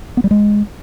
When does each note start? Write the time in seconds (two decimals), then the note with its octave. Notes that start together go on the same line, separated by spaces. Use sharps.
0.17 B3
0.24 G3
0.31 G#3